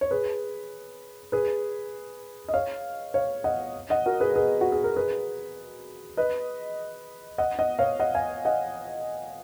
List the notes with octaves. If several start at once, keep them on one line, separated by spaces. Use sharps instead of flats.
C#5
G#4 B4
G#4 B4
D#5
C#5 F5
C#5 F5
D#5 F#5
D#5 F#5
F#4 A#4
G#4 B4
G#4 B4
F#4
G#4
A#4
G#4 B4
B4 D#5
D#5 F#5
D#5 F#5
C#5 F5
D#5 F#5
F5 G#5
D#5 F#5